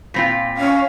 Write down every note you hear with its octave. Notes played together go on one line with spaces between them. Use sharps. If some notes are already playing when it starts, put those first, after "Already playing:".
A#2 C4 F4 B5 A#6 B6
C#4 F5